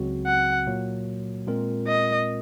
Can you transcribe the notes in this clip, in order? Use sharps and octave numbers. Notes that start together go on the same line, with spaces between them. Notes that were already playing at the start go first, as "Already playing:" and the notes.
Already playing: C#2 C#3 F#3 C4 F#4
F#5
A#2 F#3 A#3
A#2 G#3 C4 F4 A#4
D#5